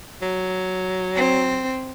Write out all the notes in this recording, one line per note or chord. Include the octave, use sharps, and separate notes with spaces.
F#3
C4